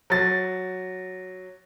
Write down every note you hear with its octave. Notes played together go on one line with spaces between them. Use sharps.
F#3 A6